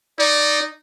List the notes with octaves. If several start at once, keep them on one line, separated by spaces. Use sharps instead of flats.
D#4 D5